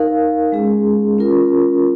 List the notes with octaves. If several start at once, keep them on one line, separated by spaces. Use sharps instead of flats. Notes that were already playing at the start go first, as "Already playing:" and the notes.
Already playing: D#4 A#4 F5
G#3 C#4 G#4
C#4 F4 A#4